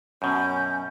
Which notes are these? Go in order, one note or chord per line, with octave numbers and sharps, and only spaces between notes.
F#2 B2 C#4 G6